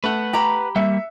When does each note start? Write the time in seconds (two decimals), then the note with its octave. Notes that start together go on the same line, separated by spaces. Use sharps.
0.04 A3 B4 F#5
0.33 G4 A#5 B5
0.76 G3 A#3 E5 C#7